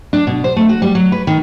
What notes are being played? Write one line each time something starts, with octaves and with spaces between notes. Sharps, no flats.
D4
B2
C5
A3
F#4
G3
F#3
B4
D#3